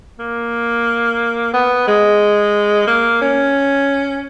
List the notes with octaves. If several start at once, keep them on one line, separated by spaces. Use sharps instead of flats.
A#3
B3
G#3
A#3
C#4